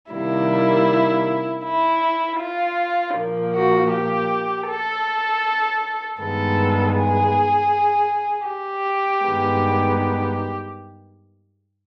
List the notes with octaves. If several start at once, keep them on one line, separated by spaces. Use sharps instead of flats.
C3 D#3 G3 A#3 E4
E4
F4
A#2 F3 A#3
F#4
G4
A4
G2 D#3 G#3 B3 A4
G#4
G4
G2 D#3 G#3 B3